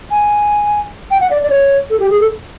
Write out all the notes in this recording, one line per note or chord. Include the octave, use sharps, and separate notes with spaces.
G#5
G5
F#5
D5
D5
C#5
A4
G4
G#4
A4